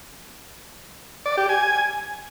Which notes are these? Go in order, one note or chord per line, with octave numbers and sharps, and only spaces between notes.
D5
G4
G#5